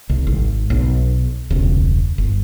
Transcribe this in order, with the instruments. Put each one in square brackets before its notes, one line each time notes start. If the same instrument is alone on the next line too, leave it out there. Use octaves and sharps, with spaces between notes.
[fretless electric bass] C2
G#1
B1
E1 C#2
G1